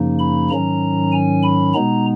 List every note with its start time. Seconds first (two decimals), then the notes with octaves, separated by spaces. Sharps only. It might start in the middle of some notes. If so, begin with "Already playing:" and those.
Already playing: F#2 C#3 F3 A#3 D#4
0.19 B5
0.50 G#2 D#3 F#3 C#4 A#5
1.12 G#5
1.43 B5
1.74 B2 G#3 B3 D#4 A#5